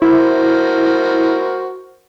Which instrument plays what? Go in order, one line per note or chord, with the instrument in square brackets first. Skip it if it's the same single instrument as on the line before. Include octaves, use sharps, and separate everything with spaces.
[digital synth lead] E4 [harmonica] F#4 A#4 C5